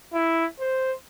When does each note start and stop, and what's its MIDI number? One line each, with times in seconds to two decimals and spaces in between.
0.13 0.45 64
0.60 0.92 72